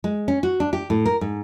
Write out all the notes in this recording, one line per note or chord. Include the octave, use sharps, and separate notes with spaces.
G#3
C#4
F#4
D4
G4
A2
A#4
G#2